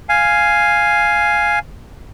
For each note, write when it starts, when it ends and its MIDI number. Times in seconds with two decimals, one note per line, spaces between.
0.09 1.59 77
0.09 1.59 80